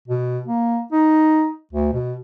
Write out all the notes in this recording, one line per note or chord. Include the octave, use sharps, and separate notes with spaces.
B2
A#3
D#4
D2
B2